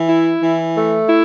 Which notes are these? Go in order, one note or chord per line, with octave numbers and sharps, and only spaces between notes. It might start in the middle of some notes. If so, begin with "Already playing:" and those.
Already playing: E3
E4
E3
A3
E4